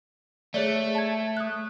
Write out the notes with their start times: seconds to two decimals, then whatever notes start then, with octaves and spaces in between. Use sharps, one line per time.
0.54 A3 G#4 C#5 D5
0.95 A5 G#6
1.37 D#6 F#6